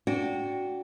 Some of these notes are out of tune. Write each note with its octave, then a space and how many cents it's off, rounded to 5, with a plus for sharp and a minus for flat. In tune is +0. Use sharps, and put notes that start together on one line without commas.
D4 -25 F#4 +0 G5 +0